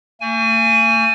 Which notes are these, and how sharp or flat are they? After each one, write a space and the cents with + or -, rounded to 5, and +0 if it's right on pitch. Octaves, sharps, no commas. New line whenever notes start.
A3 +45 G#5 +0